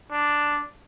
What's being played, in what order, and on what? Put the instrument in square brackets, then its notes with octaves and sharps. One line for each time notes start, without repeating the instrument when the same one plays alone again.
[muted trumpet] D4